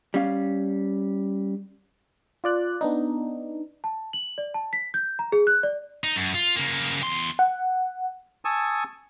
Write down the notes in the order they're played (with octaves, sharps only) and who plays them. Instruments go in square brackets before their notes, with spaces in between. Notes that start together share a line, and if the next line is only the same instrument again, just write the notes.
[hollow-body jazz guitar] G3 C#4 F5
[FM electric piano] F4 D5 F#6
B3 D4 D#4
[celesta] A5
F#7
D5
A5
B6
G6
A#5
G#4
F#6
D5
[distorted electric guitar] D#4
F#2
F4
C#3 A#3
E2 C6
[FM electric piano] F#5
[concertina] G#5 A5 C#6 D#6 E6